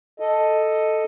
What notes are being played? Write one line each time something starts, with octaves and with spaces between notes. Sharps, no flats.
A4 D#5